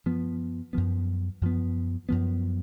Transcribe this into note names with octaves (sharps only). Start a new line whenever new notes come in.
F#2 F3 B3
F#2 F3 B3
F#2 F3 B3
F#2 F3 B3